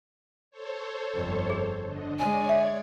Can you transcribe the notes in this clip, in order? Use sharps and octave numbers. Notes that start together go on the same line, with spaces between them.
A4 C5 C#5
G1 F2
G#4
D3 D4 D#5
G#3 C#5 D5 G#5 G#6
E5